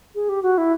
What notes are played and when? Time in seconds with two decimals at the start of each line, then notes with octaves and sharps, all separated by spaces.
0.15 G#4
0.29 G4
0.43 F#4
0.58 E4